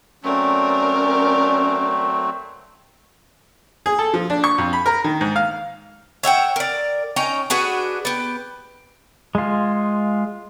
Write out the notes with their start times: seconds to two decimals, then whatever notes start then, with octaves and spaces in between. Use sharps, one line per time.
0.24 F#3 A3 C4 C#4 A#4 D5
3.86 G#4
3.99 A4
4.14 F3
4.30 D4
4.44 C#6
4.58 F2
4.73 B5
4.86 A#4
5.04 D#3
5.21 G#2
5.36 F5
6.23 C#5 E5 F#5 G5
6.56 A#4 D5
7.16 C#4 D#4 G5 A#5
7.50 D4 F#4 G#4 B4
8.05 B3 G4
9.35 G#3 F4